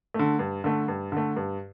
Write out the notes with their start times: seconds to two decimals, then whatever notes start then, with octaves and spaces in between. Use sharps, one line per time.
0.14 D3 A3
0.39 G2
0.64 D3 A3
0.88 G2
1.12 D3 A3
1.36 G2